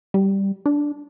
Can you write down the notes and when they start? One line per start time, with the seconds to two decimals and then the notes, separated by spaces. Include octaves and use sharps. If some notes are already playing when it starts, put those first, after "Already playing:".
0.14 G3
0.66 D4